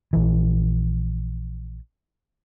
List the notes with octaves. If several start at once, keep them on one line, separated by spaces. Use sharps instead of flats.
A#1 E3